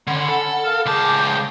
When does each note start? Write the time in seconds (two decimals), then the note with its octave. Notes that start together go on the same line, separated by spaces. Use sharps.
0.07 D3 C#4 F#5 B5
0.29 A4
0.64 A#4 F5 F6
0.86 C#2 G#4 A5 D6 G6